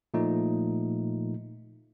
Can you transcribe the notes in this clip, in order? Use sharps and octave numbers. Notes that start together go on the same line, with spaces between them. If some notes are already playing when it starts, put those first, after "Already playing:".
A#2 F3 A3 D#4